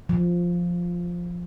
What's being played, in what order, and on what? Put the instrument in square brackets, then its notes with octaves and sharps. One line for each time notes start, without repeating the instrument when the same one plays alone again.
[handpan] F3